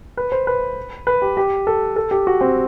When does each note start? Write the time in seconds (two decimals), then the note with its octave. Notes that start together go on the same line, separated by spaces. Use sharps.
0.17 B4
0.32 C5
0.47 B4
1.07 B4
1.22 G4
1.37 G4
1.67 A4
1.96 A4
2.11 G4
2.27 F#4
2.41 C4